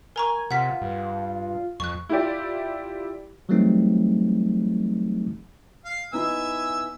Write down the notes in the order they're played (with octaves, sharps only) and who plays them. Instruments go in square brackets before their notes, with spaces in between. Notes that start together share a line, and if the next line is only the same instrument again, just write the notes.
[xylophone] A#4 A#5 C#6 [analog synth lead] G#5
[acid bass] C3 [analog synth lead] F4 [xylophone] F#5 B6
[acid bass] G2
[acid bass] F2 [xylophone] C#6 F#6
[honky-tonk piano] E4 F4 G4 D5
[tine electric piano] E3 F#3 G3 A3 C4 D#4
[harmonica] F5
[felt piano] B3 D#4 E4 [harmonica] E5 G#5 E6